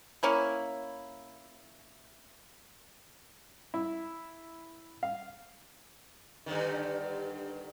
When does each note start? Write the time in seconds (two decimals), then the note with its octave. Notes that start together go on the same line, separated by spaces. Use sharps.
0.23 A#3 C#4 E4
3.74 E4
5.03 F5
6.46 G2 D3 D#3